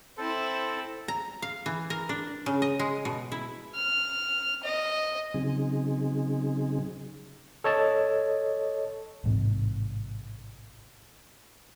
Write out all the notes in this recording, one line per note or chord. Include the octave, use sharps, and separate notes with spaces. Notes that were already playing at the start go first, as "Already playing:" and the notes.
C4 E4 A4 C5
A#5
F5
E3
A#4
D4
C#3
D#5
G#3
B2
E4
F6
D#5
C#3 F#3 C4 D#4 G#4
A4 C#5 D#5 A5
A1 G#2 C3